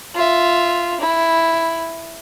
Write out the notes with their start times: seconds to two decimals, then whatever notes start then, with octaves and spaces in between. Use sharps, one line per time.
0.15 F4 E5
1.00 E4